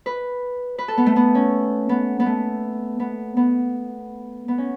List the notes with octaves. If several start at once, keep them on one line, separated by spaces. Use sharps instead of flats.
B4
B4
A4
B3
A3
B3
C#4
B3
B3
A3
B3
B3
B3
C#4